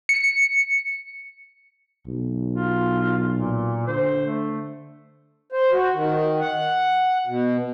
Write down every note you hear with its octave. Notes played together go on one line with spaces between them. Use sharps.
C#7
B1
F4
A#2
D3 C5
A3
C5
F#4
D#3
F#5
B2